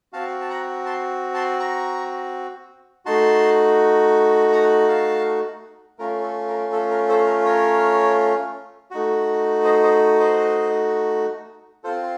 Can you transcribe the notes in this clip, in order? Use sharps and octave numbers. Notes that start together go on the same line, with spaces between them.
C4 F#4 F5 A5
A5
F#5 A#5
A5 C6
A5 C6
A#5 C#6
A3 D#4 F#4 A5 C6
F#5 A#5
F5 A5
A3 C#4 F4 A#4
A4
A#4
A4
A#4
A4 C5
A#4
A#4 C#5
A3 D#4 F#4
C5 D#5
C5 D#5
C5 D#5
C4 F4 A4 C5